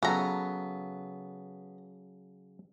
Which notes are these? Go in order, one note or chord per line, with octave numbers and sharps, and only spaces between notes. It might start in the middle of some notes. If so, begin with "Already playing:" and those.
C#3 F#3 B3 A4 A#5